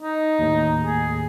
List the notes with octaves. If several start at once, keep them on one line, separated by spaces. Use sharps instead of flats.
D#4
D#2 A2
G#4